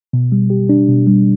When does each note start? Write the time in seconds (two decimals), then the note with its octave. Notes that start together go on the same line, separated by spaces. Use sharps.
0.13 B2
0.32 G3
0.50 G4
0.69 D4
0.88 B2
1.07 G3